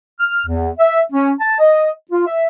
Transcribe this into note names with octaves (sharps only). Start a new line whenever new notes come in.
F6
E2
E5
C#4
A5
D#5
F4
E5